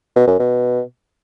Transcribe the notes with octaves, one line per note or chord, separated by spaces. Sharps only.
B2
F#2
B2